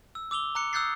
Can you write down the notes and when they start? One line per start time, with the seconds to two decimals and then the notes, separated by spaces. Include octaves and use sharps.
0.15 E6
0.31 D6 E6 F7 G7
0.55 A#5 D6 F#6 C#7
0.73 D#6 E6 F#6 G6 A6 C7